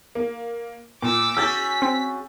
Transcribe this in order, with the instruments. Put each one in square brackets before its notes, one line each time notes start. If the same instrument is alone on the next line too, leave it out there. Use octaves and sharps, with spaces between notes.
[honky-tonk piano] A#3
[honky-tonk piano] A#2 [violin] D6 E6
[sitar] C#4 F#4 G#4 [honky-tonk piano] E6 G6 A6 [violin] B6
[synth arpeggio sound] C4